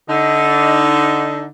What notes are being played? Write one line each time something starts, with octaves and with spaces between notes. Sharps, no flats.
D3 D#4